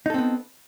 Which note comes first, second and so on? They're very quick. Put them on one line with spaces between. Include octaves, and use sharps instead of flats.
D#4 A4 C4 B3